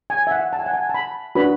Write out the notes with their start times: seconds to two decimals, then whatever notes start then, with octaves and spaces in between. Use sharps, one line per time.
0.10 G#5
0.27 E5
0.31 F#5
0.53 A5
0.59 G#5
0.66 F#5
0.74 G#5
0.89 A5
0.94 B5
1.35 D4 F#4 B4 B5